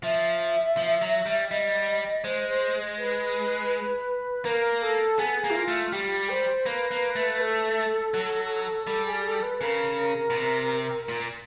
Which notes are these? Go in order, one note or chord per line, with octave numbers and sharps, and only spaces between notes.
F3 E5
F3
F#3
G3
G3 D#5
G#3 C5
C5
B4
A#3 A#4
A4
B3 G#4
A#3
E4
F4
A3
G3 G4
C5
A#3 B4
A#3
A3
A4
F#3
G3 A4
G#4
A4
B4
C#3 A#4
B2
C3
A#2